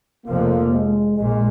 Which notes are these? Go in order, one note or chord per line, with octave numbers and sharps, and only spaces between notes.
F1 F2 C3 F3 A#3
G#3
A#1 A#2 G#3